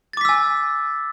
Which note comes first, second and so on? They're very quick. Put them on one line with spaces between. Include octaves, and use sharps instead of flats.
A6 D6 B6 E6 G#5